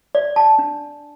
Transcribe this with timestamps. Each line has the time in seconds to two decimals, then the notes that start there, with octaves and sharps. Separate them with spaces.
0.15 D5
0.36 A5
0.59 D4